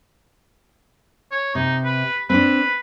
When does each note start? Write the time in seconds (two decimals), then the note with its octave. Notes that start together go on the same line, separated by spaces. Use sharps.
1.32 C#5
1.55 C3 D#4
1.84 B4
2.30 C4 D4 B4